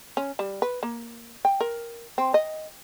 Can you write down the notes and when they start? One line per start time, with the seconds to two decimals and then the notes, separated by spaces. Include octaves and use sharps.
0.17 C#4
0.39 G3
0.62 B4
0.83 A#3
1.45 G5
1.61 A#4
2.18 C4
2.34 D#5